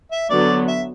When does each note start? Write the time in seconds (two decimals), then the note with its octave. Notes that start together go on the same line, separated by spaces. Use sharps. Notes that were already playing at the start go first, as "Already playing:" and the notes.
0.12 E5
0.30 D3 F#3 B3 D5
0.68 E5